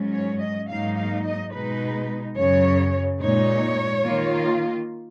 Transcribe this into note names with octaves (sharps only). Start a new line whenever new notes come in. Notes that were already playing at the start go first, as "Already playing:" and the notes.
Already playing: G#2 F#3 C#4
C#5
D#5
G#2 F#3 A#3 D#4 F5
F5
D#5
B2 G#3 D#4 B4
F#2 C#3 F#3 C#5
A#2 G#3 D#4 C#5
D#3 A#3 F4